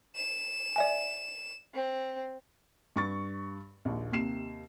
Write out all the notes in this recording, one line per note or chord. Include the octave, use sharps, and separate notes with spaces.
E7
D5 E5 G#5
C4
G2 C#6 A6
A#1 D#2
D#2 C3 C7 E7